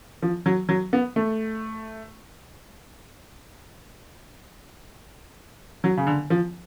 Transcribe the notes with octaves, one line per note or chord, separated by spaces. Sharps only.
F3
F#3
F#3
B3
A3
F#3
C#3
D3
F3